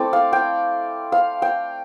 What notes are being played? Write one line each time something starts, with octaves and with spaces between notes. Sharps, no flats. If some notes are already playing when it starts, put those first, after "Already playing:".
Already playing: A3 C4 E4 D5
F5
G5
F5
G5